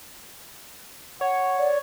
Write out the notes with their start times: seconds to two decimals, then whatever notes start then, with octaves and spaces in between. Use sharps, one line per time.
1.21 C#5 F#5
1.59 D5